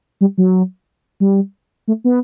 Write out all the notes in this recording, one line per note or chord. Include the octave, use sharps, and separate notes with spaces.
G3
F#3
G3
A3
B3